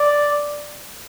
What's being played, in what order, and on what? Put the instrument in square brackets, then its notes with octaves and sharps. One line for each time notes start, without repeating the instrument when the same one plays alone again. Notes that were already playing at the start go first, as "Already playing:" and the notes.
Already playing: [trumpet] D5